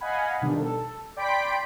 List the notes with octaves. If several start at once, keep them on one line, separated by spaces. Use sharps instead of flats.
D#5 F5 F#5 G#5 B5
B2 D#3 F3 G3 D4
A4
D5 G5 B5 C6 B6 D7